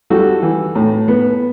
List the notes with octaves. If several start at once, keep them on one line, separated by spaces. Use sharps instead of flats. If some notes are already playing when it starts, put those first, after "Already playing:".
G3 F#4 A4
E3
A2
B3